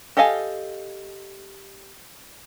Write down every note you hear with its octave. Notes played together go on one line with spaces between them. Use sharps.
G4 A4 D#5 F5 G#5